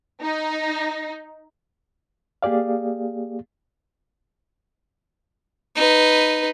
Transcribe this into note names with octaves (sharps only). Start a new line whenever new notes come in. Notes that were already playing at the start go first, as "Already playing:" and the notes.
D#4
A#3 G4 G#4 D5 F5
D#4 B4